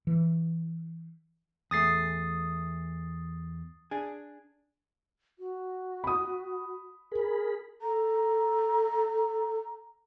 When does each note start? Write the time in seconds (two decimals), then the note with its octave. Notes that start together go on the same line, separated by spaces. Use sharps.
0.07 E3
1.71 E2 A3 D#6 A6 C7
3.91 D4 G#4
5.39 F#4
6.04 B5 D#6
7.12 G#4 A#4 B5
7.82 A4 A#5